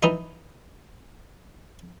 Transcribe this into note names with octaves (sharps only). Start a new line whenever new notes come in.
E3 D#4 E4